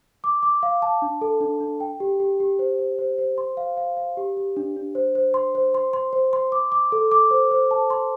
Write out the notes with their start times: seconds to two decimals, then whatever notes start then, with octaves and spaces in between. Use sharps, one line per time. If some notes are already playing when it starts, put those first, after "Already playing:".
0.24 D6
0.43 D6
0.63 F5
0.82 A5
1.02 D4
1.21 A4
1.41 D4
1.60 D4
1.80 G5
2.00 G4
2.20 G4
2.40 G4
2.59 C5
2.79 C5
2.99 C5
3.18 C5
3.38 C6
3.57 F5
3.77 F5
3.97 F5
4.17 G4
4.37 G4
4.57 D4
4.76 D4
4.95 C5
5.15 C5
5.34 C6
5.55 C5
5.74 C6
5.93 C6
6.13 C5
6.33 C6
6.52 D6
6.72 D6
6.92 A4
7.11 D6
7.31 C5
7.51 C5
7.71 A5
7.90 C6